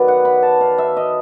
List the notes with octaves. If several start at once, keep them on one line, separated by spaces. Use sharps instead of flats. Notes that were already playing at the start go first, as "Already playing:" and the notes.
Already playing: D#3 F#3 B3 B4 D5
F#5
B5
A5
F5
E5
D#5